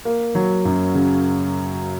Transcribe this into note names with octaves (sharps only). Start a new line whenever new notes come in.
A#3
F#3
F#2
C#3